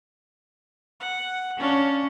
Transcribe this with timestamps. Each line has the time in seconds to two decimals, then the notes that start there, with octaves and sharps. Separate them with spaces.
1.00 F#5
1.59 C#4 D4 F5